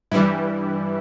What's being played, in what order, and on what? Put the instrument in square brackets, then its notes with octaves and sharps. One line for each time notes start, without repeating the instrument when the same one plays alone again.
[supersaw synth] G2 E3 G3 E4